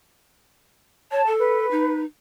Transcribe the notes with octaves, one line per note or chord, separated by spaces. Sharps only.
C#5 A5
A4
B4
D#4